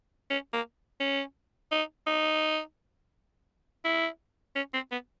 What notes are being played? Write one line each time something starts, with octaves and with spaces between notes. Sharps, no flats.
C#4
A#3
C#4
D#4
D#4
E4
C#4
C4
B3